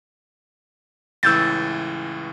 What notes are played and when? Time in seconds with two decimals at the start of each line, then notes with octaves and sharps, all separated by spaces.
1.23 C#2 A2 E3 E6 G6 A6